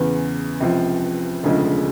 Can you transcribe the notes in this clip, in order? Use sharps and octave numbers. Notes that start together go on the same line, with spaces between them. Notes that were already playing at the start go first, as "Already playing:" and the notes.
Already playing: E2 C#3 E3
C#2 C3 F3
E1 D2 C#3 F3 G#3